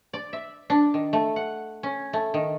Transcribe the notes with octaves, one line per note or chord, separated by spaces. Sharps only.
D5
E5
D4
D#3
A3
F#5
C#4
A3
D#3